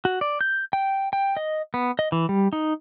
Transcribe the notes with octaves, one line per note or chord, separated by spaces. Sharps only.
F#4
D5
G6
G5
G5
D#5
B3
D#5
E3
G3
D#4